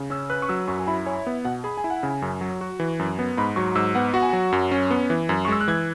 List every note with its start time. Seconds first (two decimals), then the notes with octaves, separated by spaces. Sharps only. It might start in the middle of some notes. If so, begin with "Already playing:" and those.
Already playing: C#3
0.10 C#4 E6
0.30 B4 F#6
0.42 C#6
0.49 F#3 E6
0.68 F#2 C#6
0.79 G#5
0.87 E4 B5
1.06 C#5 G#5
1.27 B3
1.45 B2 F#5
1.64 G#4 B5
1.77 G#5
1.84 E4
1.90 F#5
2.03 C#3 G#5
2.22 F#2
2.41 F#3
2.61 F#4
2.80 E3
2.99 F#2
3.19 B3
3.37 G#2 B5
3.56 F#3 C#6
3.75 G#2 E6
3.95 B3 F#5
4.14 F#4 F#5
4.22 G#5
4.29 F#3 F#5
4.52 F#2
4.72 C#4
4.91 B3
5.10 E3
5.29 F#2
5.45 C#6
5.48 G#3 E6
5.60 F#6
5.68 E3 G#6